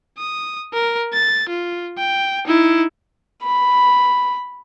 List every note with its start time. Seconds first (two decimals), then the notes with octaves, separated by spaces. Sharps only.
0.18 D#6
0.74 A#4
1.13 A6
1.49 F4
1.98 G5
2.46 D#4 E4
3.43 B5